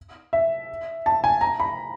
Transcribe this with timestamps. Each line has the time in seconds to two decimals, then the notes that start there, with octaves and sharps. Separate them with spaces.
0.33 E5
1.06 A5
1.24 G#5
1.41 A#5
1.60 B5